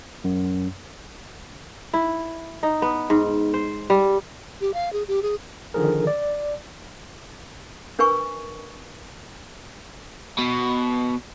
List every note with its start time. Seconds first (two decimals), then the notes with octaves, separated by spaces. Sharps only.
0.24 F#2
1.93 E4
2.63 D#4
2.82 B3
3.10 G#2
3.54 C5
3.90 G3
4.61 G4
4.74 F5
4.93 G#4
5.08 G4
5.22 G#4
5.74 D3 D#3 F3 G#4 A#4
6.07 D5
7.99 D4 A#4 B4 G#5 C#6
10.38 B2